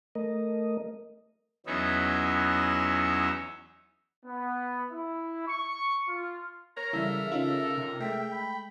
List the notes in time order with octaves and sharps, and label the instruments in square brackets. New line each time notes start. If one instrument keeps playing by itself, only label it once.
[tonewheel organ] A3 A#4 D#5
[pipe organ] E2 F#3 B3 C#4 D#4 E5
[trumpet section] B3
E4
C#6
F4
[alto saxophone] A#4 [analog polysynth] C#5 [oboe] A#5
[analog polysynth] C#3 E5 F5 [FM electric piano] E3 G3 E4 [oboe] A4
[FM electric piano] C#4 D#4 F4
[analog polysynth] C3
[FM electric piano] G#3 A3 [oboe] E5 [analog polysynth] G5
[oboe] B5